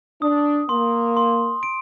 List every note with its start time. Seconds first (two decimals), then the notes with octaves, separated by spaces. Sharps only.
0.21 D4 D#6
0.69 A#3 C6
1.17 C6
1.63 D7